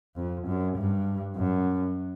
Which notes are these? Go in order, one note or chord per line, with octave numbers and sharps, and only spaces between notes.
F2
F#2
G2
F#2